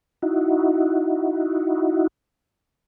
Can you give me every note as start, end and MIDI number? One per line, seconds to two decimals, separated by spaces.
0.22 2.07 63
0.22 2.07 64
0.22 2.07 66